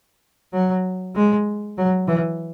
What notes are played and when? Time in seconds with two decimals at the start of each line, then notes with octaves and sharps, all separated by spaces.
0.53 F#3
1.15 G#3
1.78 F#3
2.08 E3